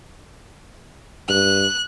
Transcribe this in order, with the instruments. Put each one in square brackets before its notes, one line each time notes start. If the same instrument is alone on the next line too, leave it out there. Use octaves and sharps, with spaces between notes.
[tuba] G2 [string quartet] F#6